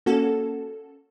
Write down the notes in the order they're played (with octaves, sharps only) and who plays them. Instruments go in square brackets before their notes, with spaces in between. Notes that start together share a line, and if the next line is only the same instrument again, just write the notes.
[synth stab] A#3 C#4 F#4 A4